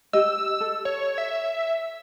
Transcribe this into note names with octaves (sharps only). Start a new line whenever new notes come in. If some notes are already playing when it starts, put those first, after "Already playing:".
G4 D#5 E6
A4
C#5
E5